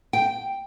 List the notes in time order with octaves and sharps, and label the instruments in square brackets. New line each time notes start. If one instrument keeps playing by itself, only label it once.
[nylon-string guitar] G5